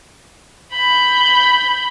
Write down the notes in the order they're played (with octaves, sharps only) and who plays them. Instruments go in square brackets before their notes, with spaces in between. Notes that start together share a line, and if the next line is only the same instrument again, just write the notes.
[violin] B5 G6